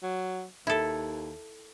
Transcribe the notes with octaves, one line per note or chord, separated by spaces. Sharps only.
F#3
D#2 E4 A4